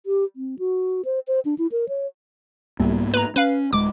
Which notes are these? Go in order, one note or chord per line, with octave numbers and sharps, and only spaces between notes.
G4
C4
F#4
C5
C5
D4
E4
A#4
C#5
C2 G#2 A#3 B3
B4 A#5
C#4 B4 F5
D1 G#3 D6